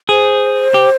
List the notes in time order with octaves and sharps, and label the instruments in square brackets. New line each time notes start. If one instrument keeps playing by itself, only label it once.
[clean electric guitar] G#4 [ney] C5
[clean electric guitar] G4